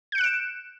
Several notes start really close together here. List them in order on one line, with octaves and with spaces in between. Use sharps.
G6 C#7 F#6 D7 E7